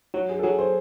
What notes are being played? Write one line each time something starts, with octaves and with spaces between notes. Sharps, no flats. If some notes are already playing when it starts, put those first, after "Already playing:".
F#3 F#4
G#4
A4
F#3 G#4
C5